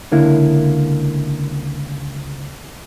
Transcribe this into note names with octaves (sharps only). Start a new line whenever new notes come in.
C#2 D3 A#3 E4